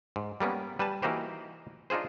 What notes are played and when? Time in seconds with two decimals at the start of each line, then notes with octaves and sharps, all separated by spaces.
0.16 G#2
0.40 G3 A#3 B3 C#4
0.79 G3 B4 G#5 A5
1.02 E3 A#3 D#4 F#4 G4 C5
1.90 D4 D#4 F4 G#4 C5